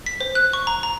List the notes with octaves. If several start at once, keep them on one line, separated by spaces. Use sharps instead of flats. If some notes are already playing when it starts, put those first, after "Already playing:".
B6
C5
F#6
C#6
A#5
A#5